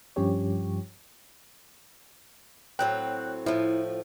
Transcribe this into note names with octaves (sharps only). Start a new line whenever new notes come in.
G2 F3 C#4 G4 C#5
A2 F#3 C4 G5 F#6
A2 F3 E4